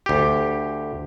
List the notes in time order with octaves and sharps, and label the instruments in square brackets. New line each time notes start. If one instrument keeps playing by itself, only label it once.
[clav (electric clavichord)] D2 G4